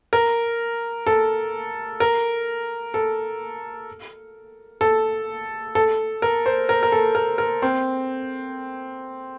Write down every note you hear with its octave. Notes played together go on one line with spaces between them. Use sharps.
A#4
A4
A#4
A4
A4
A4
A#4
C5
A#4
A#4
A4
A#4
A#4
C4